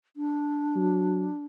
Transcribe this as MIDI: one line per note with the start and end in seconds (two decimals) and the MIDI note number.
0.16 1.45 62
0.75 1.28 54